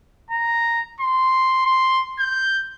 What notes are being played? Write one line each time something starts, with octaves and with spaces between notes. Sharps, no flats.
A#5
C6
C6
G6